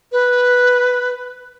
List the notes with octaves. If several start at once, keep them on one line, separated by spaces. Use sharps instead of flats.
B4